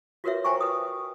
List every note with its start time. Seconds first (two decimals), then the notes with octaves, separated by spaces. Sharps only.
0.24 F4 F#4 A#4 B4 C#5 E5
0.44 C5 G5 G#5 A#5 C#6
0.61 B4 D#6